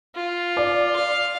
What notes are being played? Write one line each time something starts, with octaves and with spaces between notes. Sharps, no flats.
F4
D5
F5